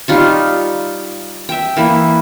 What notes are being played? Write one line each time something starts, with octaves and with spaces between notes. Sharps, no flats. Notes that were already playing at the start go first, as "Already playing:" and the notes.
G3 D#4 F4 C#6
E5 G5
E3 A#3 E4